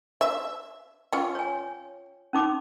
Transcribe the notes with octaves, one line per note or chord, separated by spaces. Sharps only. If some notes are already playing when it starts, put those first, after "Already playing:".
E5
C#4 F4 G5
C#5 G#5
C#4 D#4 D6